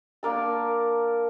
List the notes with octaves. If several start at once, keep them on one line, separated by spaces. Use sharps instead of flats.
A#3 D4 A#4 A5